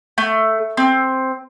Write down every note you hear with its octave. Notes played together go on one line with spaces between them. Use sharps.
A3
C4